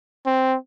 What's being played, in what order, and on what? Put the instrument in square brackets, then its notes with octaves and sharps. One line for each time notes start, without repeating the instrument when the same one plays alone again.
[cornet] C4